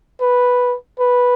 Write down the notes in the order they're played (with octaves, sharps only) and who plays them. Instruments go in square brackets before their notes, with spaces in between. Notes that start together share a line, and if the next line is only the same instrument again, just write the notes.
[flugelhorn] B4
B4